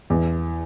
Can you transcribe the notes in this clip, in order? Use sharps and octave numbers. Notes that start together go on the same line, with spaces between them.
E2